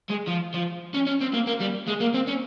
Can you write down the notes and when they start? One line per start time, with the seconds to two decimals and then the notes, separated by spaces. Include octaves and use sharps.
0.10 G#3
0.27 F3
0.54 F3
0.94 C#4
1.07 C#4
1.21 C4
1.34 A#3
1.47 A#3
1.60 G3
1.87 G#3
2.00 A#3
2.14 C4
2.27 C#4